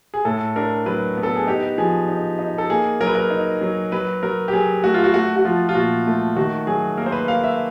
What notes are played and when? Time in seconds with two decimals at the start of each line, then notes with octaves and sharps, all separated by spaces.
0.14 G#4
0.25 A2 A4
0.56 D4 A#4
0.86 F#3 B4
1.17 B3
1.23 A4
1.36 G#4
1.47 D#4 G4
1.78 F3 G#4
2.09 D#4
2.39 D#4
2.58 A4
2.70 A#3 G#4
3.00 F#3 A#4
3.07 B4
3.15 A#4
3.31 D#4
3.61 F#3
3.92 F#3 B4
4.23 F#3 A#4
4.48 G4
4.53 F#3 G#4
4.84 A3 F#4
4.94 F4
5.04 F#4
5.14 A3 F#4
5.36 F#4
5.45 F3 F4
5.69 F4
5.75 A#2 F#4
6.06 A3
6.36 D#3 F#4
6.67 F#3 G#4
6.97 A#3 A#4
7.06 C5
7.12 B4
7.28 A#3 F5
7.43 E5